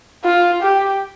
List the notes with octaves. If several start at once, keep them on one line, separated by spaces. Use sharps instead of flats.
F4
G4